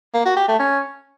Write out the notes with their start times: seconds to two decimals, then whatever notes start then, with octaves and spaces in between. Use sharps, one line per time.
0.14 A#3
0.25 F#4
0.37 G4
0.48 A3
0.59 C#4